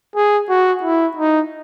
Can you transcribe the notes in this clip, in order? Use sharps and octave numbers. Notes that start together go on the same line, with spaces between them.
G#4
F#4
E4
D#4